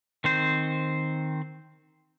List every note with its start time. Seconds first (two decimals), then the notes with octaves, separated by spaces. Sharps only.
0.24 D#3 C4 C5